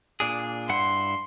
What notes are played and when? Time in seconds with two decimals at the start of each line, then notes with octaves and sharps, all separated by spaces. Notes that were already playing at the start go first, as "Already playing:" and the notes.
0.20 A#2 D4 G#4
0.69 G2 E4 F#5 C6